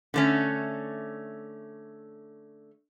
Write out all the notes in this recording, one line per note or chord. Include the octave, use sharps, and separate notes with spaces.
D3 A3 C#4